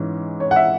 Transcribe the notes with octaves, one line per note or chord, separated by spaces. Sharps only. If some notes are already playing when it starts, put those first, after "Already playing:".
Already playing: G#2 E3 G#3 C#4
C#5
F#5
E5